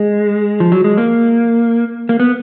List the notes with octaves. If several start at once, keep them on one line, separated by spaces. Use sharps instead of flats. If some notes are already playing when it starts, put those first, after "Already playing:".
Already playing: G#3
F3
F#3
G#3
A#3
A#3
B3